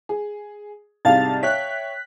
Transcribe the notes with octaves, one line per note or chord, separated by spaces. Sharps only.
G#4
C2 G#2 C3 F5 A5 A6
C#5 E5 G5 F#6 B6